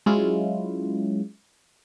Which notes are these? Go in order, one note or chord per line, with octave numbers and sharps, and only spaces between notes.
F#3 G#3 C#4 E4 F4